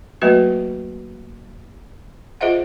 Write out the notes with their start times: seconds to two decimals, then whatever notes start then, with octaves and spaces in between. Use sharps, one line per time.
0.22 F#3 A3 A#3 F#4 B4 D#5
2.41 F4 G#4 C5 D#5 E5 F#5